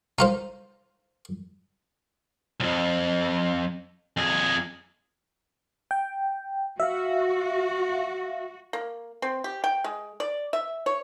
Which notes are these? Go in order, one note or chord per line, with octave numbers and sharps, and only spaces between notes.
D#4 F4 C5
C2 F2
F2 G#4
G5
F#4 E5 F5
A#3
C4
G4
G5
G#3
D5
E5
C#5